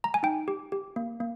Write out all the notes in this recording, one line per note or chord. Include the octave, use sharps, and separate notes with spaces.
A#5
G#5
D#4 G5
G4
G4
A#3
A#3